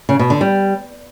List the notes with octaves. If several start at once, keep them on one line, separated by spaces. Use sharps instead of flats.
C#3
B2
D3
G3